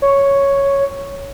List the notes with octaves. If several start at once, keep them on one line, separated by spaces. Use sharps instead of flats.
C#5